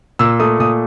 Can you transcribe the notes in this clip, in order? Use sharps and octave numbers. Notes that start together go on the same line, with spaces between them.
A#2 E6
A3 D#6
A#2 D#6